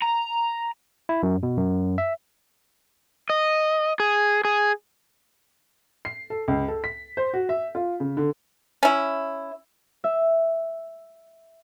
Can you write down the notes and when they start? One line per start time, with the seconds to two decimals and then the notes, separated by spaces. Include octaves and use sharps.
0.02 A#5
1.09 E4
1.23 F#2
1.43 B2
1.57 F#2
1.98 E5
3.30 D#5
4.00 G#4
4.45 G#4
6.05 C7
6.30 A4
6.48 C#2
6.68 A4
6.84 B6
7.17 C5
7.34 F#4
7.49 E5
7.75 F4
8.00 C#3
8.17 D3
8.83 C#4 E4
10.04 E5